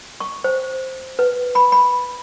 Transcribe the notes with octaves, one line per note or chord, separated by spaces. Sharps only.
C#6
C5
B4
B5
B5